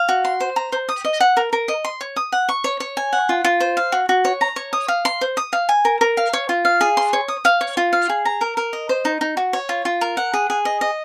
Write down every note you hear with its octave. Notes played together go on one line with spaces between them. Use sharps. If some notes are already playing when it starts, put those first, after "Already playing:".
Already playing: F5
F#4
C6
C5
A#5
C5
D#6
D#5
F#5
A#4
A#4
D#5
C6
C#5
D#6
F#5
C#6
C#5
C#5
G#5
F#5
F4
F4
C5
F5
F#4
F#4
C#5
A#5
C#5
D#6
F5
C6
C5
D#6
F5
G#5
A#4
A#4
F5
C#5
F4
F5
G#4
C6
C#5
D#6
F5
C#5
F4
F5
G#4
A#5
A#4
A#4
D#5
C5
D#4
D#4
F#4
C#5
F4
F4
A#4
F#5
G#4
G#4
D#5
D#5